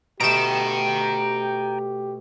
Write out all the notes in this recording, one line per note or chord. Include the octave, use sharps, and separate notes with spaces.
B2 A3 G4 G5 A#5 D7 E7